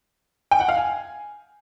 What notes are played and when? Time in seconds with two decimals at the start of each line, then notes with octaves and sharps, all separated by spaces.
0.51 G5
0.60 F#5
0.69 F5
0.77 G#5